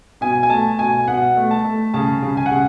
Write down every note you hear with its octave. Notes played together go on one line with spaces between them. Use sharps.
B2 G#5
G#5
A3 A5
B2 G#5
B2 F#5
A3
A5
A3
C#3 A5
C#3
G#5
F#5
C#3